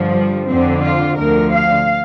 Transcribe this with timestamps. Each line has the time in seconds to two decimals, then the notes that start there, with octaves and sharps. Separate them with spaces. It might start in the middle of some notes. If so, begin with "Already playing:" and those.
Already playing: G2 D3 F3
0.14 G3
0.47 F2 D3 F3 C4
0.82 F4
1.17 D2 D3 F3 A#4
1.52 F5